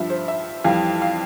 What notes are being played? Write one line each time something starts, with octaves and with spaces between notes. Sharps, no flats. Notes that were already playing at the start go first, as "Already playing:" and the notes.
Already playing: G2 F3 E5
C5
E5
F2 E3 G3 F5
F5